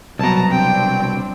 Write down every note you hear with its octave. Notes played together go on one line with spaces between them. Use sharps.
C2 B2 F#3 B3 A5 A#5
F#3 C4 D4 G5